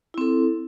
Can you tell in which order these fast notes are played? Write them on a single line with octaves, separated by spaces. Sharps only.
E4 C4 A4